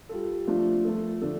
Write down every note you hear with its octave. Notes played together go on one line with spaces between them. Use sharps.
G3 F4 A4
F3 A3 D4 F4
F3 A3 F4 A4
D3 F3 A3 D4 A4